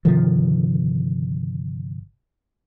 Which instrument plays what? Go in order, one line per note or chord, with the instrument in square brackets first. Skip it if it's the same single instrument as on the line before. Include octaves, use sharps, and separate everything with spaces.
[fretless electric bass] G1 C3 D#3 F3